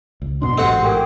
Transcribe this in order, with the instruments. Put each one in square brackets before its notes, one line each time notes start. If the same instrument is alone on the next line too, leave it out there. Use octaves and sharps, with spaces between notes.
[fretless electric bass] C#2
[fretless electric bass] F#2 B2 D4 [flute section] C6
[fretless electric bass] A1 G#2 [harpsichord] C4 F#4 [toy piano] G4 A4 D#5
[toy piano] G4 A#4 [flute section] G#4 G5 D6